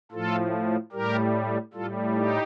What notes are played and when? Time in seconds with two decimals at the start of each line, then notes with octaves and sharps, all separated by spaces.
0.12 A2 F3 F4 A4
0.92 A2 G3 G4 A#4
1.74 A2 G3 F4 A4
2.14 D#4 G4